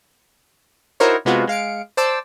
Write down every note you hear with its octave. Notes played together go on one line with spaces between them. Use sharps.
D#4 E4 F#4 A#4 C5 C#5
C3 G#3 B3 F4 F#4
G#3 F5 C#7 D7
C5 D5 A5 E6